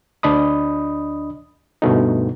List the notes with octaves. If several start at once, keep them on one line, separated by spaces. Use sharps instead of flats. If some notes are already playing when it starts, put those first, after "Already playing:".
D2 D4 D#5 B5 D#6
D2 G2 B2 A3 D#4